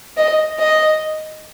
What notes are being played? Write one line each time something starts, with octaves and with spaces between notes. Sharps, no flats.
D#5
D#5